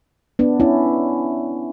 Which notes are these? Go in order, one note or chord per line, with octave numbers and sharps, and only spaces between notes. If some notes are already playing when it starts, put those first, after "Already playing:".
B3 D4
C#4 E4